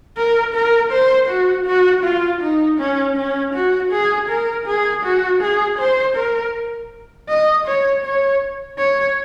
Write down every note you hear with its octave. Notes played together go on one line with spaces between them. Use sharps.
A#4
A#4
C5
F#4
F#4
F4
D#4
C#4
C#4
F#4
G#4
A#4
G#4
F#4
G#4
C5
A#4
D#5
C#5
C#5
C#5